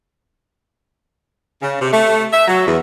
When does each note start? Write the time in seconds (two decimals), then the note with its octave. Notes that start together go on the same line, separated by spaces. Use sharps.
1.62 C#3
1.81 C3
1.93 A3
2.33 E5
2.48 F#3
2.67 E2